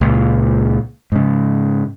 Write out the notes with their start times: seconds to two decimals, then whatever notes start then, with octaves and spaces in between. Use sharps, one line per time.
0.01 C#2 A#2
1.12 G#2 C#3